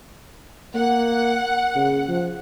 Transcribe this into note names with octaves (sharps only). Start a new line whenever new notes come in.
A#3 F#5
C#3
F3